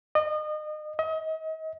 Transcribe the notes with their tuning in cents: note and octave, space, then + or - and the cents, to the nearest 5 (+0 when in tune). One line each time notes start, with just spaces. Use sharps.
D#5 -30
D#5 +40